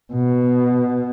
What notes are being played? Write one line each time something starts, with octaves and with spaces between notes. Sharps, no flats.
B2